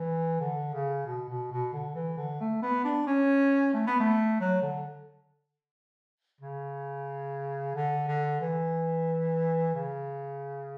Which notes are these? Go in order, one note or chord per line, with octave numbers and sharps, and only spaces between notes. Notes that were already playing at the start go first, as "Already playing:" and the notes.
Already playing: E3
D3
C#3
B2
B2
B2
D3
E3
D3
A3
B3
D4
C#4
A3
B3
A3
F#3
D3
C#3
D3
D3
E3
C#3